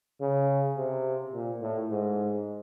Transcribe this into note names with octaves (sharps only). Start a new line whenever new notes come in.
C#3
C3
A#2
A2
G#2